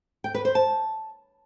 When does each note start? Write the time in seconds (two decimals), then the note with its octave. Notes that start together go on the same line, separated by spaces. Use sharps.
0.24 G5
0.35 B4
0.45 C5
0.55 A5